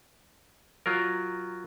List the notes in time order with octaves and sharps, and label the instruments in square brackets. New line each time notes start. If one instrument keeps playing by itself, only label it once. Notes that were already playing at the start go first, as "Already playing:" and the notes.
[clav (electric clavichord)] F#3 F4 A#4